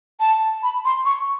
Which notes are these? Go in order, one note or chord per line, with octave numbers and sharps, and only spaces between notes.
A5
B5
C6
C#6